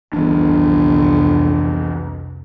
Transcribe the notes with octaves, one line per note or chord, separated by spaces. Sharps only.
G1 C2 F2 E3 D4